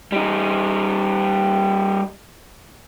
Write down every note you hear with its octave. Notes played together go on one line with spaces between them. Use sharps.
G3 D#4